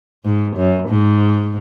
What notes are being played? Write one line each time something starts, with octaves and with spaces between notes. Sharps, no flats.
G#2
F#2
G#2